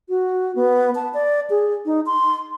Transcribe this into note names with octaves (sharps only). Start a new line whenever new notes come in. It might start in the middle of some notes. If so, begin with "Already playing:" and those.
F#4
B3
A5
D5
G#4
D#4
C6